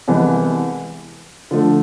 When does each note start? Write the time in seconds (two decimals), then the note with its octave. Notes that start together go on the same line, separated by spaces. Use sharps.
0.08 C2 C3 E3 G#3 B3
1.51 D3 F3 A3